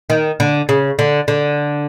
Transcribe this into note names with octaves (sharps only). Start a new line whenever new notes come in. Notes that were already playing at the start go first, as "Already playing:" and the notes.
D#3
D3
C#3
D3
D3